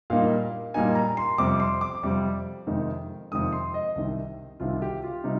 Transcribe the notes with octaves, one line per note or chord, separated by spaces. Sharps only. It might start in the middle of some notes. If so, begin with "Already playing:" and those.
A#2 G3 A#3 D#4 F5
A#2 G3 A#3 D#4 G#5
A#5
C6
F2 C3 G3 D6
C6
D6
F2 C3 G3
F2 C3 D#3 G#3
F2 C3 D#3 G#3 D#6
C6
D#5
C2 C3 D#3
C2 C3 D#3 F4
G4
F4
C3 G3 D#4